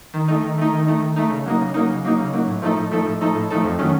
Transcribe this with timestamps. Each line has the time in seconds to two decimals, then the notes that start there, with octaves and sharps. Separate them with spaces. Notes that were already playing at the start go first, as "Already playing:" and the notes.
0.14 D#3
0.28 A3 D#4
0.44 D#3
0.58 A3 D#4
0.72 D#3
0.87 A3 D#4
1.02 D#3
1.16 A3 D#4
1.30 C#3
1.46 F#3 A#3 D#4
1.60 C#3
1.74 F#3 A#3 D#4
1.90 C#3
2.04 F#3 A#3 D#4
2.18 C#3
2.33 F#3 A#3 D#4
2.47 A2
2.62 F3 A3 D#4 A4
2.76 A2
2.91 F3 A3 D#4 A4
3.06 A2
3.21 F3 A3 D#4 A4
3.35 A2
3.50 F3 A3 D#4 A4
3.65 F2
3.79 D#3 F#3 A3 C#4